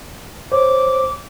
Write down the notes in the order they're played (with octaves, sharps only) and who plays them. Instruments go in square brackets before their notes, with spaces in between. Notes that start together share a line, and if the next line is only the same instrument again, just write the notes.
[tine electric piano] C5 C#5 [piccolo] D6